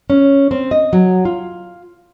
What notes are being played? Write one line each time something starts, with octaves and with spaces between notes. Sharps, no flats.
C#4
C4
D#5
F#3
F4